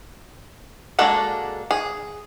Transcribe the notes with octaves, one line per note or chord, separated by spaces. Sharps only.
G#3 A#3 D4 F#4 A4
G#4